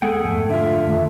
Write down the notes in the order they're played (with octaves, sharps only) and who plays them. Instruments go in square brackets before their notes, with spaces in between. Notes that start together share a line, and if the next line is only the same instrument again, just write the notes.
[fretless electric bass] E1 G#3 B3 [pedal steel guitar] G#4 F#5 G5 [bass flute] A4
[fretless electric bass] F2 G#2 F3 [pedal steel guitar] A3
[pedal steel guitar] D3 F4 [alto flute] E5
[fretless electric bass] F2 A#2 D#3 [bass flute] A3